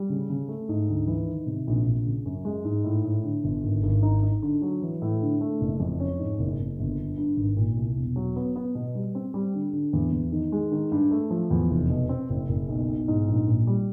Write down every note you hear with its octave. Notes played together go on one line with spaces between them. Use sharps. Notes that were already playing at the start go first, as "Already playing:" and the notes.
Already playing: G3
C#3
C#3
A3
G#2
D2
E3
D#3
C3
A#1
A#1
C#3
F#2
G#3
G#2
A2
A2
D3
G1
G#1
G#1
D#4
D#4
D3
F#3
E3
A2
D3
A3
F#1
F2
C#4
G#2
F#1
F#1
G1
D3
G2
G#1
A#2
C2
E1
F#3
B3
B3
B2
G3
C4
G3
D3
D3
E2
E2
D#3
G#3
D#3
G2
A3
F3
E2
F1
B2
C4
F#1
F#1
B1
B1
G#2
A#1
A#2
G3